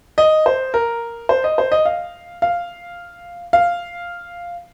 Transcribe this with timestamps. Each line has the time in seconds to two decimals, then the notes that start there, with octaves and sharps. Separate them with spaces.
0.18 D#5
0.46 C5
0.74 A#4
1.29 C5
1.44 D#5
1.58 C5
1.72 D#5
1.86 F5
2.42 F5
3.53 F5